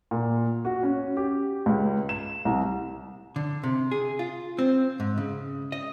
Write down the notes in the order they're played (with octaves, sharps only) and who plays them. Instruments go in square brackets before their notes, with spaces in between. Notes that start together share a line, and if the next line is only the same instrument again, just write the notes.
[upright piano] A#2
F#4
C#4
G4
C#2
E7
C2
[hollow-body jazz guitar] D3
C3
G#4
F4
C4
G#2
C#3
D#5